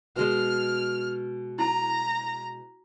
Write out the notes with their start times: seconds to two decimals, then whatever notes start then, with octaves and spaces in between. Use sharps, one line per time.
0.16 B2 G#3 F6
1.59 E4 A5 A#5